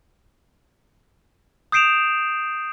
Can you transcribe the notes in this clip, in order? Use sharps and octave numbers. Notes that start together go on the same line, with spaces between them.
D#6 G6 C7 D7 E7 F7